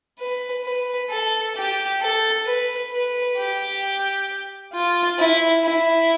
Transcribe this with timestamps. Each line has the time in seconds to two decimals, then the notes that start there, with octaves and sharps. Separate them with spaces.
0.19 B4
0.64 B4
1.10 A4
1.56 G4
2.01 A4
2.46 B4
2.92 B4
3.37 G4
4.73 F4
5.19 E4
5.64 E4